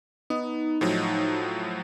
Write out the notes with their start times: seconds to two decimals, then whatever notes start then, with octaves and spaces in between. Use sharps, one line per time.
0.30 B3 D#4
0.81 A2 F3 F#3